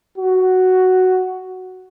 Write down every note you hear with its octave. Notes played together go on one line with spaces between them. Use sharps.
F#4